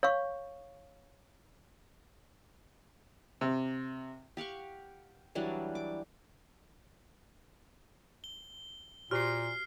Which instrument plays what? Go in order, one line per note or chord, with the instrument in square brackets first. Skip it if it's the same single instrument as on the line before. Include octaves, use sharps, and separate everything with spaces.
[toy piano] C#5 F5 C#6
[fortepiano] C3
[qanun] G4 F5 F#5 C#6
E3 F#3 G3 D4
D6
[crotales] G7
[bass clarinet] A#2 [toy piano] F#4 G4 C5 [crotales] F6 C7